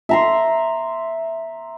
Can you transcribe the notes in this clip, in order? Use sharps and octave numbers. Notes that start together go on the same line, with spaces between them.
E5 A#5 C6